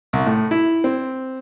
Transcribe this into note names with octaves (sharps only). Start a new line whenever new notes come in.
C2
A2
E4
C4